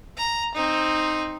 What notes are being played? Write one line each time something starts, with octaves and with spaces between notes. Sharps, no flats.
A#5
C4 D#4